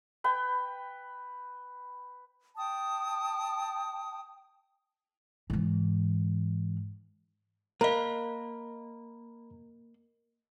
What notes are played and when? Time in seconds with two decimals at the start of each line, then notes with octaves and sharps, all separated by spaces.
0.24 B4 G5
2.56 G5 A5 D#6
5.50 G#2 E3
7.81 A#3 A#4 D#5 A#5 B5